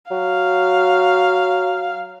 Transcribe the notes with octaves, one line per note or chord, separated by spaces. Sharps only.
F#3 F5